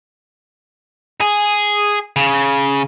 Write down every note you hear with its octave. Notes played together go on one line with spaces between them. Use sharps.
G#4
C#3